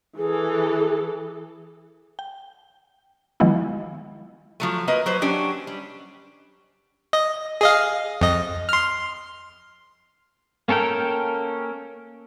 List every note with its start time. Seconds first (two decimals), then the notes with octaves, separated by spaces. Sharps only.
0.18 E3 G#4 A4
2.19 G5
3.40 D#3 F3 F#3 G#3 B3 E4
4.60 F3 F#3 A3
4.88 A#3 B4 D#5
5.06 F#3 B4 C5
5.22 F#3 C#4 D4 G4
5.67 G3
7.13 D#5
7.61 G#4 D#5 F5
8.21 F2 D#5
8.69 C6 F6
10.68 A#3 C#4 A4 A#4 G5